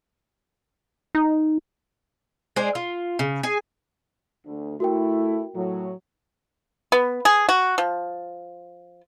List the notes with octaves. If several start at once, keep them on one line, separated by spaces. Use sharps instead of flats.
D#4
G#3 C5 D5 G#5
F4
C#3
G#4 G#5
D2
A3 E4 F#4 A#4 G5
A2 F#3
B3
G#4
F#4
F3